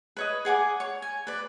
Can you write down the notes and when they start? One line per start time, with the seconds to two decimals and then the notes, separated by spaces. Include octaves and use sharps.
0.17 B4 C#5 D#5
0.45 G#4 F#5 G#5 D6
0.80 C#5
1.02 G#5
1.27 B4 D5